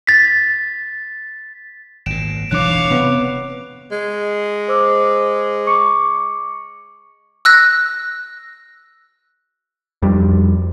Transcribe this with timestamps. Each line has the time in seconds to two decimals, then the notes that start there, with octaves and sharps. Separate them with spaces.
0.07 A6 B6
2.06 G#1 A#2 D7 E7
2.51 E1 D#3 E3 D4 C#5 F5 D6 F#6
2.91 C3 B3
3.92 G#3
4.68 C5 D6 E6
5.66 C#6 D6 C#7
7.45 E6 F#6 A#6
10.02 F2 G3